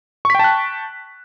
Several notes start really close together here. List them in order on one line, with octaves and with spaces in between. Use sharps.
C#6 B6 G5 A5 F#6